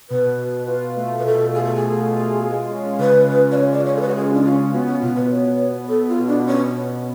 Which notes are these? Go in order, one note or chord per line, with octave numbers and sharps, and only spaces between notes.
B2 B4
B2
F4
A3
B4
B2 A4
F4 G#4
A4
G#4
B2
F4
G#3
C#4
C#3 B4
G#3
D5
C#4 C#5
D5
C#3 C#5
A4
B4
F#4
G#3 G#4
D4
C#4 F4
B3 F#4
C#4
B2 F4
B4
B3 C#5
B3
B3 A4
F4
B2
D4
B2 C#4